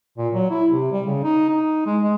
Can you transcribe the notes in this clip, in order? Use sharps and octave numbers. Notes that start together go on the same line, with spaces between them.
A#2
F#3
E4
C3
G3
C#3
D#4
D#4
G#3
G#3